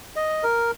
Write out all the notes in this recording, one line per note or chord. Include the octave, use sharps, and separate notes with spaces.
D#5
A#4